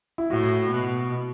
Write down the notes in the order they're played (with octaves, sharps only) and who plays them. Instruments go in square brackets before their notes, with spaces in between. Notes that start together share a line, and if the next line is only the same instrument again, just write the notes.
[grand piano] E4
[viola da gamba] A2 [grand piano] F#4
[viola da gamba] B2